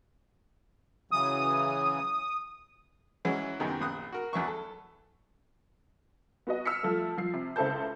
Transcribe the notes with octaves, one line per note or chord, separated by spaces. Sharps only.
C#3 E3 F#3 D#6
E3 F#3 G#3 C#4 E4
F#2 C3 D#3 B3
A#1 D#6 F#6
F#4 A#4
E2 F#3 E5 C#6
A4
B3 F#4 D#5
E6 F6 B6 C#7
F3 A3
F3 C7
C3
C#2 E4 A4 C5 A5 G6